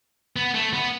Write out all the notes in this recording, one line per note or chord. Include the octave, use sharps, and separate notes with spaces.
B3
A3
B3